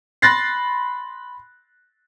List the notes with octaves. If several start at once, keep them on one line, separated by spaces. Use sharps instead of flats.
B5 C6 F#6 A6 A#6 C7